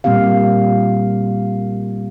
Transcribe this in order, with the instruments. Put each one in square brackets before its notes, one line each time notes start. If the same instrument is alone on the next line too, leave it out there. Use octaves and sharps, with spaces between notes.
[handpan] A#2 G3 A#3 C4 G4 F5